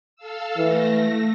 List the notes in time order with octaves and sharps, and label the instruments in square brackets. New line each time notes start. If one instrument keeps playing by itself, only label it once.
[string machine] A4 F5 E6
[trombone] E3 [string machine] A3 A#6